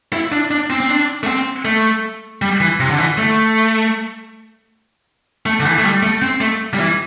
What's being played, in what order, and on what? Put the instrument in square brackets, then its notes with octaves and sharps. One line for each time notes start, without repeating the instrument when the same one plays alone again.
[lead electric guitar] E4
D4
D4
C4
C4
D4
A3
C4
A3
G3
E3
C3
D3
E3
A3
A3
D3
E3
A3
G3
A3
C4
A3
G3
E3